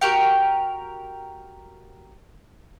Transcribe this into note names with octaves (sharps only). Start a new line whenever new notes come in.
F#4 G4 A#4 G5